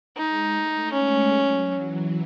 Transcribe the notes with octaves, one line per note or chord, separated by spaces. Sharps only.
G#3 D#4
A3
G#3 C#4
F#3
E3